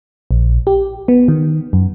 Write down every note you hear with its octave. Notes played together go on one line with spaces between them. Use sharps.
A#1
G4
B3
D#3
F#2